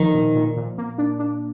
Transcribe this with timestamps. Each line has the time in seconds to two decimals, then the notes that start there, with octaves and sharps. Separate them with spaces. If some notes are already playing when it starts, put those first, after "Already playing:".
Already playing: D#3 F3
0.14 A#2
0.35 A#2
0.57 A#2
0.78 A#3
0.98 D4
1.19 D4